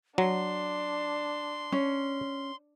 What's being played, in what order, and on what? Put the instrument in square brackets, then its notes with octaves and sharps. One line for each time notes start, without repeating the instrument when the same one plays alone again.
[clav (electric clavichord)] F#3 [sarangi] D4 [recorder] C6
[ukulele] C#4